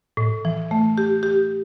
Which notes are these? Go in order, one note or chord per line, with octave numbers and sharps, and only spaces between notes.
A2
E3
A3
G4
G4